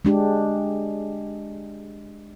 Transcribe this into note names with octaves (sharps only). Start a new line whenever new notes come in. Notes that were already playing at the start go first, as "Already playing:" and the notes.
G#3 D4 G4